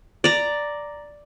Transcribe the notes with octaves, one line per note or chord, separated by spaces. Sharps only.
D5 A#5